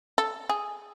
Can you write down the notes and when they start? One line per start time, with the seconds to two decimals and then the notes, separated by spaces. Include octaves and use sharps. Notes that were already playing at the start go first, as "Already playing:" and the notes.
0.18 A4
0.49 G#4